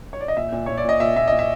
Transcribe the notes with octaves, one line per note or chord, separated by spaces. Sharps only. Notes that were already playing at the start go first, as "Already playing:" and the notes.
C#5
D5
D#5
A#2 E5
A#2
A#2 C#5
D5
A#2 D#5
A#2 E5
A#2 E5
A#2 D#5
E5